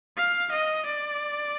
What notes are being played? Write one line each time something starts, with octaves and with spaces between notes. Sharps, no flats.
F5
D#5
D5